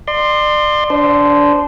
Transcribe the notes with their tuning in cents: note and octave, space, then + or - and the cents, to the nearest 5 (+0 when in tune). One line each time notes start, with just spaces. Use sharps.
D5 +35 C6 +0
D4 -20 C5 -15